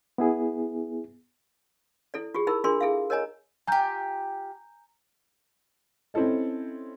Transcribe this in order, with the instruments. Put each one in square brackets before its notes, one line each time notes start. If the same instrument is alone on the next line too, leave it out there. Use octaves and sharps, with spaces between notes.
[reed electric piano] B3 E4 G#4
[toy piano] E4 A4 D5
F4 G4 G#4
D#4 E4 A#4 B5 E6
D4 F4 G#4 A#4 D5 C6
E4 G#4 A4 E5 F5
A#4 C#5 D#5 G#5 A#5
[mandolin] F4 G4 [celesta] G#5 A#5 G6
[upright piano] C4 C#4 E4 A4 D#5